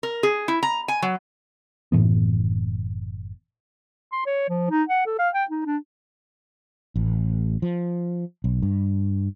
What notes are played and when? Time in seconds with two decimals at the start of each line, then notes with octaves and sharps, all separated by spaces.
0.03 A#4
0.23 G#4
0.48 E4
0.63 A#5
0.88 G#5
1.02 F#3
1.92 F#1 A2 E3 B3
4.12 C6
4.26 C#5
4.49 F3
4.70 D#4
4.89 F#5
5.06 A4
5.19 F5
5.34 G5
5.50 D#4
5.66 D4
6.96 A1
7.62 F3
8.44 B1
8.62 G2